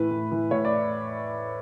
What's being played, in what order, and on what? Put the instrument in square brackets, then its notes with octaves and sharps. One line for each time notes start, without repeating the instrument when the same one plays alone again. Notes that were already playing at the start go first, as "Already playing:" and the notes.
Already playing: [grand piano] A2 E3 B4
A2
E3
A2 C#5
D5